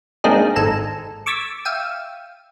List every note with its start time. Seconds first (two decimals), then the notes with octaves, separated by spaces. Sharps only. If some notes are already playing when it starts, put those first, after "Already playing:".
0.24 G#3 A#3 C4 D4 D#4 G#4
0.56 G#1 G#2 A4 G#5 A#5 E7
1.26 C#6 D6 E6 G#6 A6 B6
1.65 E5 F5 G5 D#7 E7